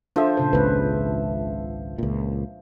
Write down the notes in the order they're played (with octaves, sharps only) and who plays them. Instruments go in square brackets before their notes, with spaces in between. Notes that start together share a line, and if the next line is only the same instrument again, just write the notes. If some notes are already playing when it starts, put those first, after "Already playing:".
[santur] F3 E5 [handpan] D4 A4 C5
[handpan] A#2 C#3 C5
[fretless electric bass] G#1 C#2 [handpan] C4 B4
[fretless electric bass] C#2 A#2